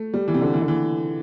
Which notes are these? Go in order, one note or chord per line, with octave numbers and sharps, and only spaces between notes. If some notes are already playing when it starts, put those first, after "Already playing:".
Already playing: A3
G3
E3
C3
D3
E3
D3
E3